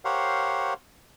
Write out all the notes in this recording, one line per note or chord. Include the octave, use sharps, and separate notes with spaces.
G4 A#4 C5 C#5 F5 F#5